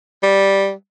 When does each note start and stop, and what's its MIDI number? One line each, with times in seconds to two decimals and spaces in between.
0.23 0.72 55